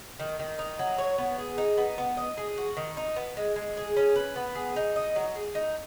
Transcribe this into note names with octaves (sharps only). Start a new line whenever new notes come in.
D#3
D#3
D#4
F#3
C#5
B3
G#4
D#4
B3
B3
D#5
G#4
F#4
D#3
D#4
B3
G#3
G#3
G#4
C#4
B4
B3
G#4
D#4
D#5
F#3
G#4
D#4